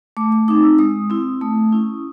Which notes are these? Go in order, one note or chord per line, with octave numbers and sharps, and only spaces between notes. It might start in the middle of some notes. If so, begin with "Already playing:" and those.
A3 D6
D6
C4 D#4 D6
E6
G#3 D#6
C4 E4
A3 D#6
C#4 E4